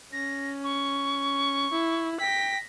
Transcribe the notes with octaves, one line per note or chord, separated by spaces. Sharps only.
C#4 A#6
C#6
E4
G5 A#6 B6